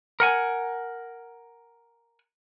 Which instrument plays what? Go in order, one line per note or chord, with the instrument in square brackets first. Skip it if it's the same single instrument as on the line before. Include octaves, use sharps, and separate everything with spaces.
[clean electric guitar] A#4 F#5 G#5